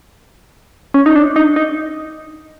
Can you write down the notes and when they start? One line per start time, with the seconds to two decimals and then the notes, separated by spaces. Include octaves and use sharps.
0.94 C#4
1.06 D#4
1.16 D4
1.36 D#4
1.56 D#4